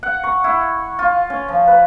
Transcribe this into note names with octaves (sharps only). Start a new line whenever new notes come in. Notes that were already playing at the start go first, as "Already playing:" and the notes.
F#5
C#6
E4
F4
C#4
F3
B4